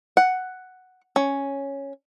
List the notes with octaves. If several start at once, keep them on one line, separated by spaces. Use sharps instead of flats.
F#5
C#4